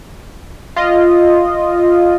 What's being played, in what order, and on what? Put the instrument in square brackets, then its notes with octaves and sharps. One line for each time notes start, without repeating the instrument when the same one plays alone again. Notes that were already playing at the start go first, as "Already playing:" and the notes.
[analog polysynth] F4 D#5